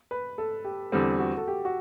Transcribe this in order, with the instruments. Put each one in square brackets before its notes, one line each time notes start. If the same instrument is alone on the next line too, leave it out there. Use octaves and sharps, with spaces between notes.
[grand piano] B4
A4
G4
[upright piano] E2 D3 G3 C4
[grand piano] F#4
A4
G4
F#4